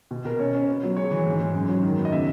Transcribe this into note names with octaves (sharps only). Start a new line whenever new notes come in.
B2
B2 A#4
C#4 C#5
C#4
B3
F#3
G#3 C#5
E3
G#2
G#2
F#2
F#3
D#3
B3
D#5
C#3 E5